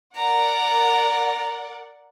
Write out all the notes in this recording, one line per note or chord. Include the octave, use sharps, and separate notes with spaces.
A#4 D5 F#5 A#5